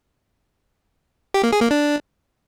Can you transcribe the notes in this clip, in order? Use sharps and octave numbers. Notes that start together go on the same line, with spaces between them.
G4
A#3
G#4
A#3
D4